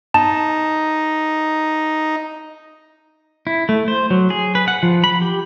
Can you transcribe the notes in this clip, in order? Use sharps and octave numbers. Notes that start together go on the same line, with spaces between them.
D#4 A5
E4
A3
C5
F#3
G#4
B4
F#5
F3
B5
G4